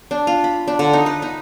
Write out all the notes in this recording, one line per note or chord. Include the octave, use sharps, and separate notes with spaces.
D4
F4
B5
D4
D3
D#4
B4
D#4